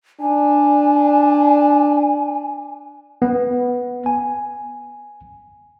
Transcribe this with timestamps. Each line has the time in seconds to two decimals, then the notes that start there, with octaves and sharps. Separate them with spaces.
0.20 D4 G#5
3.22 B3
4.06 G#5